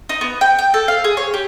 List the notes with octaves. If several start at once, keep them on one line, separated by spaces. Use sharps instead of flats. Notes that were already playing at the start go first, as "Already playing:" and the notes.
D#4
B3
G5
G5
A4
F5
G#4
C#5
G4